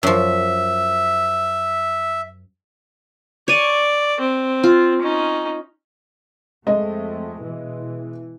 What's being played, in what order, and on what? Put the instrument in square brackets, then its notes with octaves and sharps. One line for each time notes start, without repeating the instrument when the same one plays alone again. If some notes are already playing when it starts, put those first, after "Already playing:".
[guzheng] F#2 F3 [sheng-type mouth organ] E5
[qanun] C#5 G#5 [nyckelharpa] D5
[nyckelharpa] C4
[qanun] F4
[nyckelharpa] C#4 D#4
[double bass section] F2 A3 [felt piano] G#3 D#5
[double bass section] B2 E3